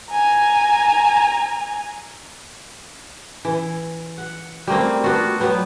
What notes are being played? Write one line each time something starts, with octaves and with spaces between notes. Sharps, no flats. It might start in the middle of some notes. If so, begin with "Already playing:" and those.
G#5 A#5
E3
F#5
G3 A3 A#3 C4
B3 D4 F4 F#4
F#3 G3 B3